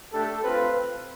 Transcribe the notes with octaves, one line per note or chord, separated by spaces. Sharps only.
A3 D4 G4 A4
C4 F4 B4